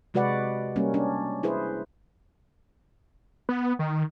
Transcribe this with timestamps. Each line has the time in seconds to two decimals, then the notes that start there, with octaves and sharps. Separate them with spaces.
0.14 C3 G#3 F#4 B4 D5 F#5
0.76 G3 A#3 C#4
0.94 C#4 D4
1.43 E4 G#4 B4 C5
3.49 B3
3.79 D#3